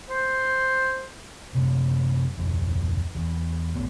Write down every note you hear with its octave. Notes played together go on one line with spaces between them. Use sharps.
C5
F#2 C3
D1 F2
E2
A1 D#2 A2 B3